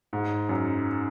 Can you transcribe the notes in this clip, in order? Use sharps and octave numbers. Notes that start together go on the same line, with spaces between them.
G#2
F#2